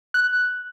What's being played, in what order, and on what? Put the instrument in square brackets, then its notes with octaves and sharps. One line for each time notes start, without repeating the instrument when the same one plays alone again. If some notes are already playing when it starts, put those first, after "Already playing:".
[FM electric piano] F#6